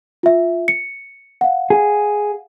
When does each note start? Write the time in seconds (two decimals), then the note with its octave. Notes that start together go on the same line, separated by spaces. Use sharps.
0.23 F4 E5
0.68 C#7
1.41 F5 F#5
1.70 G#4